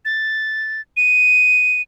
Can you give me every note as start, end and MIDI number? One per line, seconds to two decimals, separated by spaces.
0.05 0.81 93
0.97 1.82 99